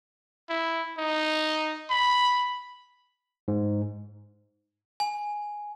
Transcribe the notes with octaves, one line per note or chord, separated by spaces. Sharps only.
E4
D#4
B5
G#2
G#5